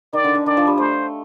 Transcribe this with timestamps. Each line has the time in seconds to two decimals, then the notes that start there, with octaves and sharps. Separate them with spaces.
0.13 D#3 D5
0.24 D3
0.35 D3
0.46 D#3 D5
0.57 F3
0.67 G3
0.78 A3 C5